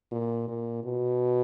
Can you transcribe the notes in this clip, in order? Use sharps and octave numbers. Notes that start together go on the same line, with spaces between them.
A#2
A#2
B2